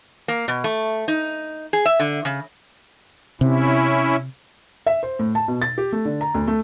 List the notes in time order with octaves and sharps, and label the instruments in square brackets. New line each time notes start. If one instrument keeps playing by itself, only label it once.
[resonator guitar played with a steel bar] A#3
B2
A3
D#4
G#4
E5
D3
C#3
[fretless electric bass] C3 [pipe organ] C#4 E4
[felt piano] E5
C5
A2
A5
B2
A6
G4
A3
D3
A#5
D2
A3